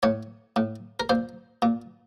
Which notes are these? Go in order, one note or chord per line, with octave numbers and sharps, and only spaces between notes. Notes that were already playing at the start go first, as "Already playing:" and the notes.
A2 C#5
A2
A#4
A#2 C5
A#2